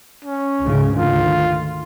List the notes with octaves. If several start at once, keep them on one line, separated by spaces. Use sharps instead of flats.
C#4
C#2 G#2 C#3
D2 D#3 F4